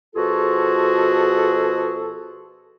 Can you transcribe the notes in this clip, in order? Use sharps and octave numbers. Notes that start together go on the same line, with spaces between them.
B2 F3 F4 F#4 G#4 A4